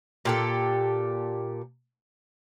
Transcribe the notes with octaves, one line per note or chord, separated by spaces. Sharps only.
A#2 G4 A4